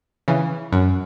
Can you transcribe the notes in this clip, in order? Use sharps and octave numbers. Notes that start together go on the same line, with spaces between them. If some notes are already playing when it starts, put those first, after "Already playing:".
C#3 E3
F#2